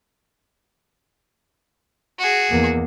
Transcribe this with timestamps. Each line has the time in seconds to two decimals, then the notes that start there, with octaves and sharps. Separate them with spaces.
2.19 F#4 G#4
2.51 E2 A#3